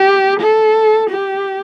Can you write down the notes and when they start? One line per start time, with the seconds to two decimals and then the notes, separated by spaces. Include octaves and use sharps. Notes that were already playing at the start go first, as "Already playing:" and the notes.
Already playing: G4
0.41 A4
1.10 G4